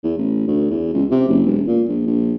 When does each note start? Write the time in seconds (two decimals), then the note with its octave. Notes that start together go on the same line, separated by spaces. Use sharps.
0.04 E2
0.17 A1
0.48 D2
0.70 E2
0.94 C#2
1.11 C3
1.29 F#1
1.46 E1
1.68 A#2
1.89 A#1
2.07 A#1